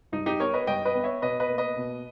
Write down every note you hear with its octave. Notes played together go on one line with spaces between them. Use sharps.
G2 D#4
D#4 G4
B3 A#4 C#5
B4 D#5
G2 D#5 G5
B4 D#5
B3
C#5 E5
B2 B4 D#5
B4 D#5
A#3
B4 D#5
B2